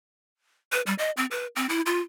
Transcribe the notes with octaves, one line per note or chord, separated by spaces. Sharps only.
B4
G3
D#5
C4
B4
C4
E4
F4